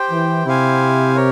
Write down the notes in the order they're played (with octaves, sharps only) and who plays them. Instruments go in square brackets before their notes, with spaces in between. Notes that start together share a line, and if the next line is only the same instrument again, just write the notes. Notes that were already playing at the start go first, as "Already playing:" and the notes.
Already playing: [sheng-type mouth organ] G4 C5 G5
[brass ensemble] E3
[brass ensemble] C3 [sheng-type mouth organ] E4 G4 C5 F5 G#5
[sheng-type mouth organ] G4 A#4 C#5